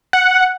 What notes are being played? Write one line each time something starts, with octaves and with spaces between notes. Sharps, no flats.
F#5